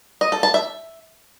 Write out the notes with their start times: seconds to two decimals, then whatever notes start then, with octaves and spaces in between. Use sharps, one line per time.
0.21 D#5
0.32 A4
0.43 A5
0.54 E5